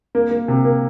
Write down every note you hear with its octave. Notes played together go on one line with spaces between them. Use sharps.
A#3
A#3
C3
A#3